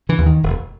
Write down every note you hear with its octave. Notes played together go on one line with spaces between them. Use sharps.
D3 E3
D#2 C#3
D#3
E1